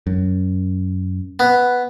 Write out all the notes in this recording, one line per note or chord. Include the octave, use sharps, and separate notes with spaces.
F#2
B3